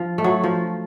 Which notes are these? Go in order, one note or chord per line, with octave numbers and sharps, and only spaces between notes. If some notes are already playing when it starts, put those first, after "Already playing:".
Already playing: F3
A3
F#3
F3